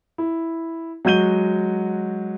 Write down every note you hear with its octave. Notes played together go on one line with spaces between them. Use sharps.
E4
F#3 G#3 F#4 G6 D#7 G7